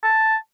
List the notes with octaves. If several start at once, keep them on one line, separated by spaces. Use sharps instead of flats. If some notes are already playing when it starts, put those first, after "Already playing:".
A5